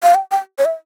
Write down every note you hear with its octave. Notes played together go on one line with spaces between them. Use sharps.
F5
G5
G5
C#5
E5